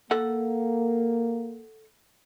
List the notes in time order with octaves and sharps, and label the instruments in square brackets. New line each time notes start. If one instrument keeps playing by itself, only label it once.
[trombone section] A#3 [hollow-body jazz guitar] A4 F#5